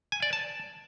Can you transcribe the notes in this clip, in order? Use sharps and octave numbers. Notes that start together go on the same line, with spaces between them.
G#5
D5
A5